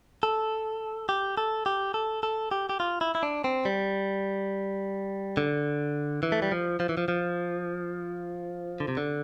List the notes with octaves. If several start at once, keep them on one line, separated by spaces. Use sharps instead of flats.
A4
G4
A4
G4
A4
A4
G4
G4
F4
E4
E4
D4
C4
G3
D3
E3
A3
G3
F3
F3
E3
F3
F3
D3
C3
D3